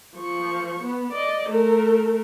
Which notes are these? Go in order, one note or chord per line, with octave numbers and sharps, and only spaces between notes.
F3 C#6
B3
D5 D#5
A3 A#4